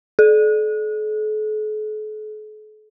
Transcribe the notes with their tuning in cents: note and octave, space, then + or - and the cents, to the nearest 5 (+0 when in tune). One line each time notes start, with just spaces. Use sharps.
A4 -45